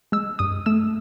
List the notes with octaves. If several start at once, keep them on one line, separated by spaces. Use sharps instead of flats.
G#3 E6
G2 D#6
A3 E6